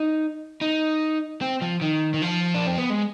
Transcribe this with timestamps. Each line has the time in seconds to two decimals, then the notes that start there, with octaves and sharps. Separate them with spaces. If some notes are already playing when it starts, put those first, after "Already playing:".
Already playing: D#4
0.61 D#4
1.41 C4
1.62 F3
1.81 D#3
2.14 D#3
2.22 F3
2.55 D4
2.67 C4
2.78 B3
2.90 G#3